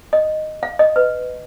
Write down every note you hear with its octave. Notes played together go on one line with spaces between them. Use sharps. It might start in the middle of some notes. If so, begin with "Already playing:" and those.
D#5
F5
D#5
B4